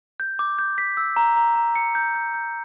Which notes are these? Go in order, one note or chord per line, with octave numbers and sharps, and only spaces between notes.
G6
D6
G6
B6
E6
A#5
A#5
A#5
C#7
G6
G6
G6